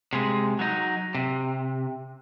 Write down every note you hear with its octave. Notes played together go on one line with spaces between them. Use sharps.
C3 G#3
F#3 D#4
C3